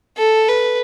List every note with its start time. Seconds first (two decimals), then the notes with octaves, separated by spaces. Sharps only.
0.18 A4
0.48 B4